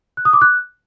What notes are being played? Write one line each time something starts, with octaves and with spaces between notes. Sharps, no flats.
F#6
D#6
D6
F#6